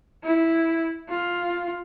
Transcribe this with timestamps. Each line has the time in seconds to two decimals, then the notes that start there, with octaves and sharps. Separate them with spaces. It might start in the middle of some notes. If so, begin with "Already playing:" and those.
0.24 E4
1.09 F4